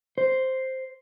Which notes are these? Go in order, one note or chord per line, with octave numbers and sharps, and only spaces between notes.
C5